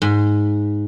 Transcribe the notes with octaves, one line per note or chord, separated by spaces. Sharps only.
G#2